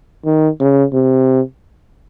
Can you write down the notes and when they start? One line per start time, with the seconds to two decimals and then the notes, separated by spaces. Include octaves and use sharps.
0.25 D#3
0.60 C#3
0.93 C3